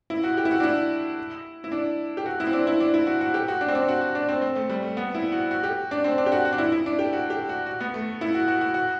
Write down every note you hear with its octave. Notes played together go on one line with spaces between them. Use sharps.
E4
F#4
G4
E4
F#4
D4
E4
E4
D4
G4
F#4
E4
C4
D4
E4
D4
E4
F#4
F#4
G4
F#4
D4
C4
D4
F#4
F#4
D4
C4
C4
A3
G3
A3
B3
E4
F#4
F#4
G4
D4
C4
D4
G4
F#4
F#4
D4
E4
E4
D4
G4
F#4
G4
F#4
F#4
B3
A3
E4
F#4
F#4
F#4
F#4